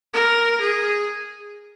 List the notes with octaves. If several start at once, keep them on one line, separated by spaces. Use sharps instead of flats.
A#4
G#4